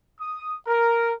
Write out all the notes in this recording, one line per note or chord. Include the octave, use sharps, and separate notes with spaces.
D#6
A#4